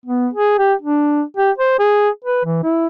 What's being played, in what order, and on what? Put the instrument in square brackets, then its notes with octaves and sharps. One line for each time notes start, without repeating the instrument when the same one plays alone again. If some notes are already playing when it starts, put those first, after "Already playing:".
[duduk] B3
G#4
G4
D4
G4
C5
G#4
B4
E3
E4